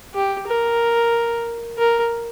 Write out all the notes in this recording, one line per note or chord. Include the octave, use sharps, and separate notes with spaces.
G4
A#4
A#4